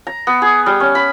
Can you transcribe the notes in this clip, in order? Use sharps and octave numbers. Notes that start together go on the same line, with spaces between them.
A#5
B3
G#4
G3
C#4
B5